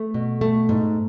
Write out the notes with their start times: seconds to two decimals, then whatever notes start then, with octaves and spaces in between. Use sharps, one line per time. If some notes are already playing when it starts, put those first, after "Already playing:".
Already playing: A3
0.14 B2
0.41 A3
0.69 G#2